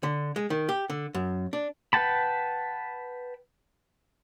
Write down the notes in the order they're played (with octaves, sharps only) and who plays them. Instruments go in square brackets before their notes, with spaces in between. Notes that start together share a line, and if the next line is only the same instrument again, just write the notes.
[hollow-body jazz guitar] D3
G#3
D#3
G4
D3
F#2
D4
[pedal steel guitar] B4 F#5 G5 A5 B5